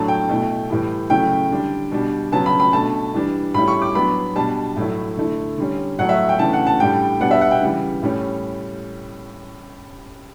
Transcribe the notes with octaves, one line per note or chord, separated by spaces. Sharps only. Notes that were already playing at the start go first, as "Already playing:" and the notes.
Already playing: A2 F#3 A3 D4 A5
G5
B2 A3 E4
A2 E3 G3
C#3 F#3 A3 E4 G5
D3 G3 D4
B2 G3 D4
C#3 F#3 B3 A5
B5
B5
B2 A3 D4 A5
E3 G3 D4
A2 G3 C#4 E4 B5
C#6
D6
F#3 B3 D4 B5
B2 G3 D4 A5
A2 F#3 A3 E4
D3 A3 E4
D3 G3 C#4
A2 F#3 A3 F#5
E5
G5
C#3 E3 A3 D4 A5
F#5
A5
A2 G3 D4 G5
B2 G3 B3 D4 F#5
E5
F#5
G5
C#3 E3 G3
A2 G3 C#4